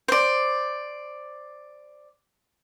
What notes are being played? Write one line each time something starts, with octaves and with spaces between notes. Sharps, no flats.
C5 D5